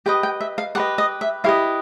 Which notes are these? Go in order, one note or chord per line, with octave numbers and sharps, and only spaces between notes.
G4 B4 D#5 G5
G5
E5
F5
G4 B4 D#5 F#5
D#5
E5
E4 G4 B4 D#5 F5